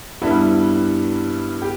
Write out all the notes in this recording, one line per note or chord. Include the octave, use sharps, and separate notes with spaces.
G2 G3 B3 E4
G4